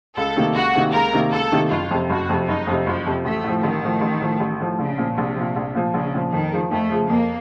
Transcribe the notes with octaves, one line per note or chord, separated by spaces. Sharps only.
C#2 A4
C3 D#3 A#3
C#2 F#4
C3 D#3 A#3
C#2 A#4
C3 D#3 A#3
C#2 A4
C3 D#3 A#3
F#1 F4
F2 C3
F#1 F#4
F2 C3
F#1 D#4
F2 C3
F#1 F3
F2 C3
A1 A3
A2
F3
A1 D#3
A2 F3
A1
A2 F3
A1
A2 F3
A#1 C#3
A#2 F3
A#1 C3
A#2 F3
A#1
A#2 F3
A#1 C#3
A#2 F3
F2 D#3
C#3 F3
F2 A3
C#3 F3
F2 A#3